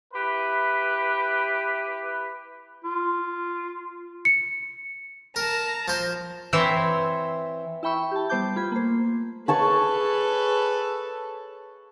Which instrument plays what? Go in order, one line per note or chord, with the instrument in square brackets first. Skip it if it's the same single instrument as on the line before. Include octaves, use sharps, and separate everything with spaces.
[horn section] E4 G4 B4
[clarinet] F4
[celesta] C#7
[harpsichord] A#4 [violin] A5 A#5
[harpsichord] F3 C5
[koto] E3 C4 E4 C5 C#5 E5
[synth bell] E4 E5 G5 B5 C#6 E6
G4 A5
G3 B3 C5 A5 D6 G6
A3 F4 B5 G#6
A#3 C5
[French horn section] G#4 [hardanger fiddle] A4 B4 [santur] C#5 A5 C#6